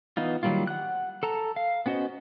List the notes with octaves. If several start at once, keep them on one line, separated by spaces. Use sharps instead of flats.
E3 B3 D#4 F4
D#3 F#3 G3 A#3 F4
F#5 F#6
A4 A5 A#5
F5
B3 C#4 F#4 C5 D#5